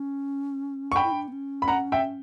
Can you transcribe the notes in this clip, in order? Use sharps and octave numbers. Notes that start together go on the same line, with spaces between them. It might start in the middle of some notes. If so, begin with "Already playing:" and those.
Already playing: C#4
C#6
D4 G5 B5
E4
D4
B3
C#4
B5
F#5 A#5
E5 G5